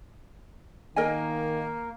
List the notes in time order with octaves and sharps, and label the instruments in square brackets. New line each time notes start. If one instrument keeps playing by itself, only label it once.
[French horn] D#3 [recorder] A#3 [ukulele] A#4 D#5 G#5